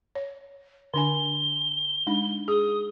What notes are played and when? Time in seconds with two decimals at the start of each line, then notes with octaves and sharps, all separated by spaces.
0.15 C#5
0.94 D3 D4 G#5 G7
2.07 G#3 D4 D#4
2.48 G#4 D#6